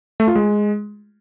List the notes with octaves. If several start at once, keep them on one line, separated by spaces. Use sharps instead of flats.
A3
F4
G#3